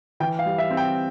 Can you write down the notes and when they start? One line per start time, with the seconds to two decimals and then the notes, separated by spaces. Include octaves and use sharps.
0.20 E3 G5
0.39 F5
0.46 G3
0.58 E5
0.70 C4
0.77 G5